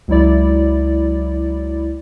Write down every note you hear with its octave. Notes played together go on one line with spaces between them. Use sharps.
C#2 F#3 E4 D5